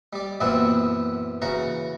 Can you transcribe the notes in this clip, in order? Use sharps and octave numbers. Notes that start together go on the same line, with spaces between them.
G3 D5
F#2 A#2 E3 B3 C4 E4
C#3 E3 F#4 F#5 A#5